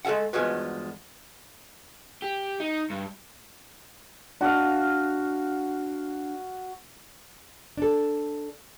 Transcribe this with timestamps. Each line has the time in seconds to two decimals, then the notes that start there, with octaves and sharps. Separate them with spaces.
0.05 G#3 A3 A4 E5 F#5
0.33 E2 G2 F3 G#3 F#4 B4
2.22 G4
2.60 D#4
2.90 G2
4.41 D4 F#4 F5
7.77 D4 A4